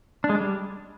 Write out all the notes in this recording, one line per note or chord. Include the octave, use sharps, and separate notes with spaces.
D4
G#3
D4
G3